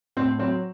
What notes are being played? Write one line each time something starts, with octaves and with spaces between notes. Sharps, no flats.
A2 C4
F#3 C4